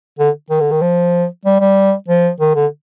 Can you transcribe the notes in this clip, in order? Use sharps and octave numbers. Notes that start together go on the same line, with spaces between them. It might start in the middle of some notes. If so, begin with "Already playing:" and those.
D3
D#3
D3
D#3
F3
G3
G3
F3
D#3
D3